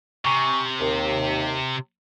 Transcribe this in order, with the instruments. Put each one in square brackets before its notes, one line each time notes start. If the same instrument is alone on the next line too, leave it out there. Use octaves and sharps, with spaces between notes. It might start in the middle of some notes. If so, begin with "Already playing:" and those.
[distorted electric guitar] C3 [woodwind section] G#5 A#5 C#6
[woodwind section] D#2